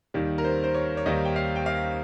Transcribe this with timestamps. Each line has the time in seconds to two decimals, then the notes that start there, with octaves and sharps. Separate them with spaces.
0.14 D#2 D#3 G3
0.38 A#4
0.44 C5
0.64 C5
0.74 C#5
0.97 C#5
1.06 D#2 D#3 G3 D#5
1.25 G5
1.36 F5
1.56 G5
1.66 F5